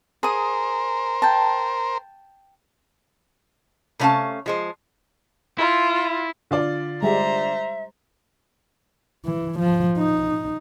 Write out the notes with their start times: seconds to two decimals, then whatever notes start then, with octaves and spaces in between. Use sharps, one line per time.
0.23 G#4 A#4 C5 D#6
1.22 G5 A5
3.99 C3 A3 C#4 C5 F5 A5
4.46 F3 G#3 C5
5.58 E4 F4
6.51 D3 F4 D5
7.02 G3 G#3 C5 E5 A#5
9.25 E3
9.59 F3
9.98 D#4